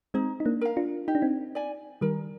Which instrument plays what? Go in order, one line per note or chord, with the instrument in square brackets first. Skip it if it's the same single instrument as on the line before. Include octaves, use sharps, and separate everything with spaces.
[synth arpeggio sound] G#3 C4 [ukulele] D#4
[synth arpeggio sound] D#4
A#3 D4
[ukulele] A#4 F5
[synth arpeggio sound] D4 F4
[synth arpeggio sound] D#4 [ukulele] G4
[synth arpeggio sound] D4
C4 D#4
[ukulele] D5 G#5
[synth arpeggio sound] D#3 G3 [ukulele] A#4